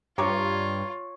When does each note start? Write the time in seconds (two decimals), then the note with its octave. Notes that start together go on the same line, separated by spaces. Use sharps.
0.18 G2 F4 C#5 A#5 C#6 D6